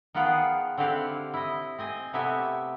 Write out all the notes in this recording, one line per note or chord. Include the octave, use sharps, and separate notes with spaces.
D#3 B3 F4 G#4 F#5 G5
D3 C4 E4 G4 F5 F#5
E4 D#5
C4 D#5 G#5
C3 A3 B3 G4 E5 G#5